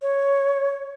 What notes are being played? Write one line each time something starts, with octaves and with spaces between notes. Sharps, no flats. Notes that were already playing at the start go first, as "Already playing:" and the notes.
C#5